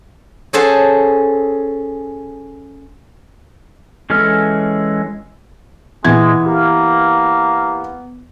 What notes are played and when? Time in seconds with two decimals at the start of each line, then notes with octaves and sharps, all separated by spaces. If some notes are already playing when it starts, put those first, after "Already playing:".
0.53 C#4 G#4 A4 C5 F#5 A5
4.10 E3 G#3 C#4 A4 F6
6.05 A#2 E3 G#3 B3 E5 G#6
6.46 A#3 G4